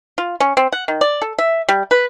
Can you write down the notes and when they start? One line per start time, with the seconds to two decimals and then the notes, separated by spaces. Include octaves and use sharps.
0.18 F4
0.40 C#4
0.57 C4
0.72 F#5
0.88 D#3
1.01 D5
1.22 A4
1.38 E5
1.69 G3
1.91 B4